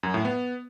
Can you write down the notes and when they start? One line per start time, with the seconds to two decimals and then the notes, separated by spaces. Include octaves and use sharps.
0.03 F#2
0.14 A2
0.25 B3